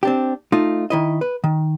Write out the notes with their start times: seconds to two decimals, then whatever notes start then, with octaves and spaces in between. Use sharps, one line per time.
0.03 C4 D4 G4
0.52 A3 D#4 F4
0.90 D#3 E4 D#5
1.21 B4
1.44 D#3